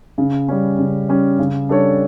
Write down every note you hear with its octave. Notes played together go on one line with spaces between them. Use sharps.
C#3
G3 C#4
C#3
G3 C#4
C#3
G3 D4 A4 C#5